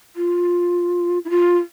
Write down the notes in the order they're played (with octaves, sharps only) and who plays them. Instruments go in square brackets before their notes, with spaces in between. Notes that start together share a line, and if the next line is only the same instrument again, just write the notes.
[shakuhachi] F4
E4
F4